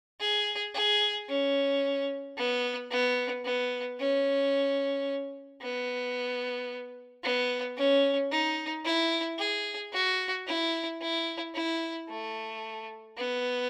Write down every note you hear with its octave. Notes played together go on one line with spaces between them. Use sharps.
G#4
G#4
C#4
B3
B3
B3
C#4
B3
B3
C#4
D#4
E4
G#4
F#4
E4
E4
E4
A3
B3